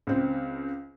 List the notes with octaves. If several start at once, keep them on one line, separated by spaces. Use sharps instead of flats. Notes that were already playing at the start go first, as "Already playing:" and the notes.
C#2 C4